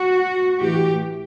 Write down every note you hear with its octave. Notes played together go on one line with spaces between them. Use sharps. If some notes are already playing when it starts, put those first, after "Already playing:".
Already playing: F#4
A2 E3 G4